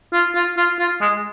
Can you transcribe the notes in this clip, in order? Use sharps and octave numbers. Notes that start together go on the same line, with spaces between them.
F4
F4
F4
F4
G#3